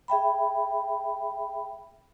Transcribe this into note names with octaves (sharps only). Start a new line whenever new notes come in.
G#4 E5 G5 B5